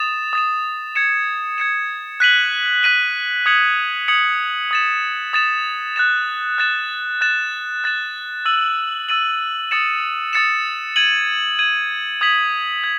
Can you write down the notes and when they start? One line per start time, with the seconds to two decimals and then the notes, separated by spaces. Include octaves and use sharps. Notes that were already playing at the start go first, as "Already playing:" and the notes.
Already playing: D#6 A6 E7
0.33 D#6 A6 E7
0.95 G#6 C#7 E7
1.58 G#6 C#7 E7
2.20 F#6 B6 D#7 F#7
2.83 F#6 B6 D#7 F#7
3.46 D#6 G#6 C#7 F#7
4.08 D#6 G#6 C#7 F#7
4.71 D#6 A6 E7
5.33 D#6 A6 E7
5.96 F#6 A6 E7
6.58 F#6 A6 E7
7.21 F#6 A6 E7
7.84 F#6 A6 E7
8.46 E6 A6 D#7 F#7
9.09 E6 A6 D#7 F#7
9.71 D#6 A6 C#7 E7
10.33 D#6 A6 C#7 E7
10.96 G#6 D#7 F#7
11.59 G#6 D#7 F#7
12.21 D#6 G#6 B6 F#7
12.84 G#6